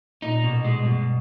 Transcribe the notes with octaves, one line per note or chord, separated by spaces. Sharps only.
A#2 D#4
B2
A#2
G#3
G2
B2